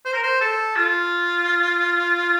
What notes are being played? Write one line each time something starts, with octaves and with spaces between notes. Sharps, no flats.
C5
A#4
C5
A4
F4